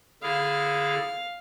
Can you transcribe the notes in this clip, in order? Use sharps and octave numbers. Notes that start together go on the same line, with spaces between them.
D3 E4 G#4 F5